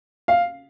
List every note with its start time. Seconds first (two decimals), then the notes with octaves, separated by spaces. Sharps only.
0.28 F5